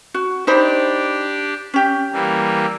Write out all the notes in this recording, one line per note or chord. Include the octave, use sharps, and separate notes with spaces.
F#4
D4 D#4 G4 C5 B5
C#4 G4
E3 G3 A#3